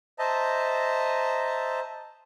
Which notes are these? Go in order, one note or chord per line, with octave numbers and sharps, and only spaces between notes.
C5 D#5 E5 A5 A#5